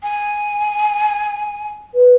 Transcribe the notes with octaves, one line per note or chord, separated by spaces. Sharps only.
G#5
B4